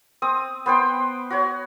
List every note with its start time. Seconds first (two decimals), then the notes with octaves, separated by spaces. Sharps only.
0.22 C4 D#6
0.66 B3 C5 G5 C6
1.30 F#4 C#5